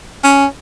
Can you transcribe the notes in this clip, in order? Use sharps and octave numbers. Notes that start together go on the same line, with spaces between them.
C#4